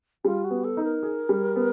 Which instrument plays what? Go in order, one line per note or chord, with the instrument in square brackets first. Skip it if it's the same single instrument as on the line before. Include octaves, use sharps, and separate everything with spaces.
[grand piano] G3 [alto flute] F4
[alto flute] F#4
[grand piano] B3
[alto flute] A4
[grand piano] D#4
[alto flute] A#4
[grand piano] G#4
G3
B3